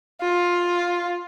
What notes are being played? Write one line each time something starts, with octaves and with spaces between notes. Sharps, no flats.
F4